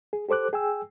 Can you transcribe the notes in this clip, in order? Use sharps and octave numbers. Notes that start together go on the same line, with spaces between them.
G#4
G4 A4 C5 D6 F#6
G#4 G5 G#5 E6